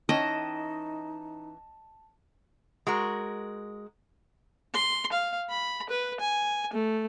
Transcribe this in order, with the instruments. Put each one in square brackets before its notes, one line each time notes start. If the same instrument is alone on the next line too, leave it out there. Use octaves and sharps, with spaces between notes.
[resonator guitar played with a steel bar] E3 C#4 G5 [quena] D#4 [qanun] D#5 [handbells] A5
[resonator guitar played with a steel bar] G#3 F#4 A#4
[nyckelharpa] C6
F5
B5
B4
G#5
A3